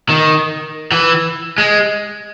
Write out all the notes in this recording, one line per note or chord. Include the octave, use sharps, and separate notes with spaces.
D#3
E3
G#3